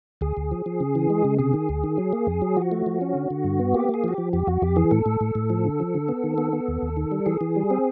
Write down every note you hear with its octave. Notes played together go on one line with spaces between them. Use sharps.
D2 G#4
D2
F3
F3
C#3
E3
G#3
C#3
C3 G#4
D#3
D2
D#3
F#3
A#3
F2
F#3
F3 F#4
A3
F3
C#4
D3
D3
G2
B3
A#3 G4
A#3 G#4
F3 F#4
G4
F3
F2 G4
F2 F#4
F2 G4
E3 G#4
A2 A4
A2
A2
A2
F3
D3
F3
D3
B3
D#3
B3
B3
D#2
D#2
D#3
G3
E3 G#4
E3
G3
C4